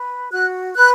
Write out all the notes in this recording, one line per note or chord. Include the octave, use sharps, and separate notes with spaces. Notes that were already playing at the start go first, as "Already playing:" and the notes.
Already playing: B4
F#4 F#6
B4 F#6